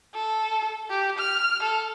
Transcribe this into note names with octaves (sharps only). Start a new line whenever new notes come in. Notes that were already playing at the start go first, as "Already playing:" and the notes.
A4
G4
F6
A4